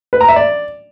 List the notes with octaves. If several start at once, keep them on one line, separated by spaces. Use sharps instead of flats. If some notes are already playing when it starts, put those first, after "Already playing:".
B4
A#5
E5
D5